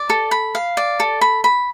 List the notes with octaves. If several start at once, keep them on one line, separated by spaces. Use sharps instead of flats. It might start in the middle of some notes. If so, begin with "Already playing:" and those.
Already playing: D5
A4
B5
F5
D5
A4
B5
B5